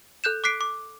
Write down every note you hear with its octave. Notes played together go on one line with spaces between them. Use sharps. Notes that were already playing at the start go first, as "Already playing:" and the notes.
A4 F#6 G6 E7
D6 F#6 B6 C7 D7
D6